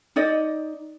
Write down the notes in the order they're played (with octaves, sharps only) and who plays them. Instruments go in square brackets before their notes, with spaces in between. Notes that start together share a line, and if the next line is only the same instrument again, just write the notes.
[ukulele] D#4 D5 D#5